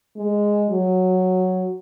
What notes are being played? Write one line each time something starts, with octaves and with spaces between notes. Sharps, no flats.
G#3
F#3